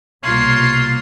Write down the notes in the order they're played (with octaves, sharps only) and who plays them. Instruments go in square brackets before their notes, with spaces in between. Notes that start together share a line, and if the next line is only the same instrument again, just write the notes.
[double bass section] C2 B2 [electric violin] A#3 C6 [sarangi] F4 [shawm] C#5